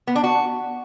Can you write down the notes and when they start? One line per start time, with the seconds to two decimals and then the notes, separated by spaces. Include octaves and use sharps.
0.07 B3
0.16 D4
0.24 F#4